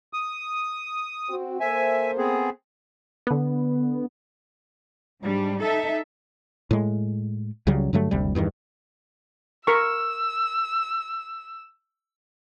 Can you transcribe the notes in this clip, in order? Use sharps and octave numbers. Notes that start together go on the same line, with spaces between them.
D#6
C4 F#4
A#3 A4 C5 E5 G#5
B3 C4 G#4
D3 B3
G#2 G3 D4
D#4 A4 E5
A2 G#3
C#2 C#3 F#3 G3
G2 D3 F#3 A3
F#1 D2 C3 G3
E2 G2 C3 D#3
A#4 C#6 E6